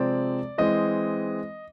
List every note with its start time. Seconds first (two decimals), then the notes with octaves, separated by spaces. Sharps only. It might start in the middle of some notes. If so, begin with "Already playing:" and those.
Already playing: C3 F3 G#3 C4 D5
0.58 E3 G#3 C4 D#5